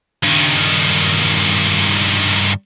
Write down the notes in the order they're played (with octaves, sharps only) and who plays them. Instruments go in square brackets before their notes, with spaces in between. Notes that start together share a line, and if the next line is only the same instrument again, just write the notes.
[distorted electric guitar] G2 D#3